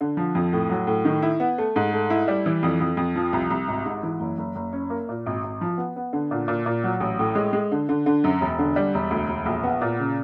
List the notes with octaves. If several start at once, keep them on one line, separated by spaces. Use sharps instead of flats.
D3
F3
F2
A2
F#3
A2
D#3
E4
B3
A3
G#2
A3
E4
G3
E3
F2
F2
F2
F3
C2
C2
G#1
G#2
E3
F#1
F#1
F#1
C#4
A#3
A#2
G#1
G#1
F3
B3
B3
D3
A#2
A#2
A#2
F#3
A1
A2
G#3
G#3
D3
D3
D3
F#2
E1
D3
G3
E1
D2
E1
A#1
B3
A#2
C#3